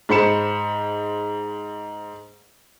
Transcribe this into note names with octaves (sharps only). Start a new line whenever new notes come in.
G#2 C5 B5 C#7 E7